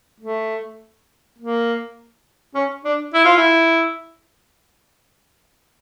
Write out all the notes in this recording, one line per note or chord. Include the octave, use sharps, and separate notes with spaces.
A3
A#3
C#4
D4
E4
F4
E4